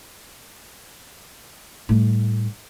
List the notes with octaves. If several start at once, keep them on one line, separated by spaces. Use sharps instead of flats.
A2 G3